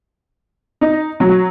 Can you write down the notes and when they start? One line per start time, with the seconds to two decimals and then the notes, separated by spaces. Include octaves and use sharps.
0.81 D#4
1.20 F#3